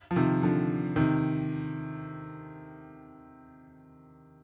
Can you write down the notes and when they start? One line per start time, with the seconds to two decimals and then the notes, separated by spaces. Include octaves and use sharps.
0.11 F3
0.16 C3 D#3
0.42 D3 F3
0.96 C3 D#3